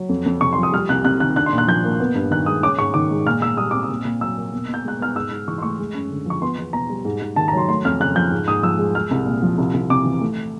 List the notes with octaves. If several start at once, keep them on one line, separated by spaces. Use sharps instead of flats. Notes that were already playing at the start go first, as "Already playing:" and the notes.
Already playing: F#3
F2
F2
C3 C#6
C6
F3
D#6
G3 F6
C2 F#6
C3 F#6
D#3 F#6
D4 F#6
C6
A#2
F#6
F3 G6
A#3
B3
G2
D#3 F#6
G#3 D#6
C#4 D6
G#2 C#6
D#3 D6
G#3
A#2 F6
A#2 E6
G3 D#6
C4 D6
D#6
A#2
A#2
F#3 E6
A#3
B2
B2
G6
G#3 F#6
B3 F6
G#2 E6
G#2
E3 C#6
C6
A3 C#6
G#3
F#2
D3
F3 C#6
B3 C6
E2
B2 A#5
G3
G#2
G#2
D#3 A5
A#5
F#3 C6
A3 C6
F2 F6
C#3 F#6
F3 G6
G#2
G#2 D#6
F3 E6
G#3
G#3 F6
C2
A#2
F3
C2
C2
C3 D6
E3
A3